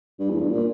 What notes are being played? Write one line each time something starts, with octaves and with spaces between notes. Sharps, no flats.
G2
E2
G2
A#2